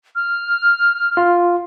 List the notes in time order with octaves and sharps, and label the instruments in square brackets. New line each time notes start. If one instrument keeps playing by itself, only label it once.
[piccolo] F6
[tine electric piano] F4